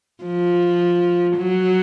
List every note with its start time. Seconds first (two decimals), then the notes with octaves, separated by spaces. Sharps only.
0.23 F3
1.37 F#3